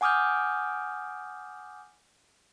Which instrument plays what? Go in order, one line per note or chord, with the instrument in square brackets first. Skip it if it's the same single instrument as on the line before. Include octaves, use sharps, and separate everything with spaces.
[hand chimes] F#5 G#5 D6 D#6 F6 G6